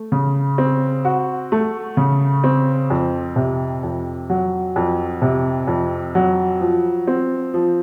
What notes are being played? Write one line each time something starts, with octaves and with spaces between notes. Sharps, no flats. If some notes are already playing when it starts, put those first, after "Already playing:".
Already playing: A3
C#3
C4
F#4
A3
C#3
C4
F2
C3
F2
F#3
F2
C3
F2
F#3
F3
C4
F3